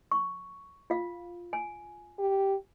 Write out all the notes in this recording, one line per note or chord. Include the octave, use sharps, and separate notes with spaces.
C#6
F4 F5
G#5
G4